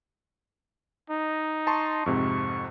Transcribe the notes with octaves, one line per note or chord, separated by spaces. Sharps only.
D#4
A5 C6 C#6
F2 G#2 C3 C#6